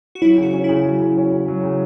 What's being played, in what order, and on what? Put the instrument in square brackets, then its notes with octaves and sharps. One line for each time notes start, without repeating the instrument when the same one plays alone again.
[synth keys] F#4
[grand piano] F#3 [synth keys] E4
[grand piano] C#3 [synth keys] F#4
[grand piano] C#4
[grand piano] C#3 [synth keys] E4
[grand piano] F#3
C#3
C#4
C#3
F#3
C#3